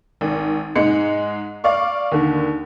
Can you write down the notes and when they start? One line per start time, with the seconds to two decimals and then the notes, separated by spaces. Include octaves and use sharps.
0.21 G#1
0.75 G#2 G#3 C#7
1.64 D5 F5 C#6
2.12 D#2 D3